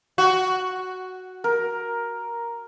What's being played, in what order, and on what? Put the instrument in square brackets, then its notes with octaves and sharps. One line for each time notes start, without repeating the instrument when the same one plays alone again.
[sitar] F#4
[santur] A#4